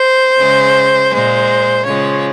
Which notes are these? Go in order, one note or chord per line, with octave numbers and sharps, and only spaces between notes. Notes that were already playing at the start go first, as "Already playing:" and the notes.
Already playing: C5
C#3 G#3
A#2 G#3 C5
C#3 F3 G#3 C#5